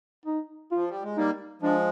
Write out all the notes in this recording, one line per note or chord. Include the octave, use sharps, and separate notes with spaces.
D#4
F3 F4
G3
G#3
G3 A#3 D#4
F3 G#3 D4